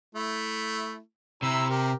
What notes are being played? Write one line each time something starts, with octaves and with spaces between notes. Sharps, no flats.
A3 E4
C3 E4 A#5 E6
G4 A#4